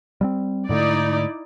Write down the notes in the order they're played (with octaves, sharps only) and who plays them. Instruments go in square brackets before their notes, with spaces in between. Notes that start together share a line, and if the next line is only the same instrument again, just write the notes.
[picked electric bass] G3 G#3 C4
[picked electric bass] G#2 D3 A3 [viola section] D#4 E4 D5